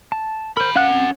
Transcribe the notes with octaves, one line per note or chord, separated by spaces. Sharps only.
A5
G#4 A#4 C5 B5
C#4 F5 F#5 F#6
C4